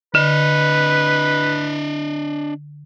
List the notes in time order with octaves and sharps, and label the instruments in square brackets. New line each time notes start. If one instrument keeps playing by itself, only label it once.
[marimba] D3 [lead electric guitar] D4 D#5 [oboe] B4